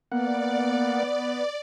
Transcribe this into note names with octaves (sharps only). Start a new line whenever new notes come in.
A#3 B3 D5 F#5